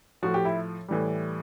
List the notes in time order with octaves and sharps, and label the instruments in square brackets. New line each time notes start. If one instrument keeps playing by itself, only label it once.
[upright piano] A2 F3 F#4
G4
E4
A2 E3 G3